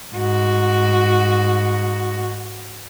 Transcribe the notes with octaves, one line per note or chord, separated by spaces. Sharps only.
G#2 F#4